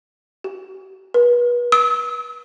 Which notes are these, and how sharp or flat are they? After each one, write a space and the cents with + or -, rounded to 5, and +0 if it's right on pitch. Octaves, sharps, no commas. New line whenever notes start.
G4 -45
B4 -35
E6 -35